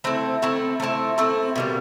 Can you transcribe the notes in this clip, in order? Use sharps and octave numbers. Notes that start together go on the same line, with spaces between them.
A3 C4 E4
A3 C4 E4
A3 C4 E4
A3 C4 E4
B2 G3 A#3